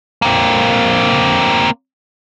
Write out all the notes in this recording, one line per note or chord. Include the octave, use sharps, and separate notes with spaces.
A#3 C4